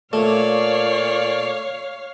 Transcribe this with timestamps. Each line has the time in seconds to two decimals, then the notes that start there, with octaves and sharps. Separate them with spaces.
0.13 A#2 A3 C#5 D5 F5